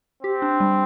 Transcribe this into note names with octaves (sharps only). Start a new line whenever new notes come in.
C4 G4
D4
G3